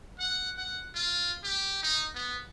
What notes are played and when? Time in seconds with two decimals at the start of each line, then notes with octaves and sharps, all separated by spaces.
0.19 F#5
0.57 F#5
0.95 F4
1.43 G4
1.83 D#4
2.15 B3